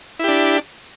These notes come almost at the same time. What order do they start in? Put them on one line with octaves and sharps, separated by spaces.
E4 G4 D4